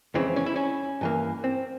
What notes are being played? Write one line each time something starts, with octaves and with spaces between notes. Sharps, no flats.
F2 C#3 E3 G#3 C4
C#4
E4
C#4
G2 E3 A#3
C4